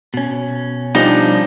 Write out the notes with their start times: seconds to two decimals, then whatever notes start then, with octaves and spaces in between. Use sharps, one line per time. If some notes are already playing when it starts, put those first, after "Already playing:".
0.14 B2 C#4
0.95 F3 G3 D4 D#4